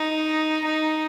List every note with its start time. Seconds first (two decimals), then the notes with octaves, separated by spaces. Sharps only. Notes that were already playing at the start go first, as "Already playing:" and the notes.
Already playing: D#4
0.64 D#4